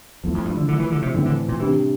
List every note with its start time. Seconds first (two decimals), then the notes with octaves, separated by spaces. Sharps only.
0.23 E2 F3 A3 E4
0.34 F2
0.45 G2
0.57 D3
0.68 D3 F3 A3 E4
0.80 E3
0.92 D3
1.02 C3
1.14 A2 D3 E3 A3 C4 E4
1.25 D3
1.49 A#2
1.60 C3 E3 G3 D4